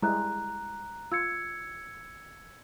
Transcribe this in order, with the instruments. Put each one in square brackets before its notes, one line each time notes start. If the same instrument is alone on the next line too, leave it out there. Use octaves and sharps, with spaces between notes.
[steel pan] G3 G#3 E4 [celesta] A#5 F#6
[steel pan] F4 [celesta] E6 G#6 C#7